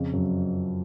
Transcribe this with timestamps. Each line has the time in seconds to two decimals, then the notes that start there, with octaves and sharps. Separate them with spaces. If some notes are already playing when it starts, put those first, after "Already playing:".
Already playing: F2 C#3
0.13 F#2